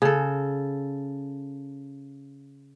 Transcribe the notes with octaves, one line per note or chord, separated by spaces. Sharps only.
C#3 A4